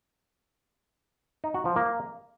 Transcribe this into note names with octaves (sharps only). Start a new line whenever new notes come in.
D#4
F#4
F3
A#3